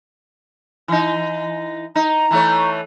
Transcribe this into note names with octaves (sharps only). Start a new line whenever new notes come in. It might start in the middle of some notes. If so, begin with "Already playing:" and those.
E3 D#4
D#4 A#5
E3 A3 C#5